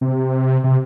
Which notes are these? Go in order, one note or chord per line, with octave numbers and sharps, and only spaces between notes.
C3
C3